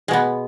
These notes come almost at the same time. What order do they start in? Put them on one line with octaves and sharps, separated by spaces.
G#3 B2 B3